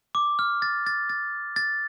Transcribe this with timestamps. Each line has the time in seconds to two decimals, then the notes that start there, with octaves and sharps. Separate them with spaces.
0.15 D6
0.39 F6
0.62 A6
0.87 A6
1.09 A6
1.56 A6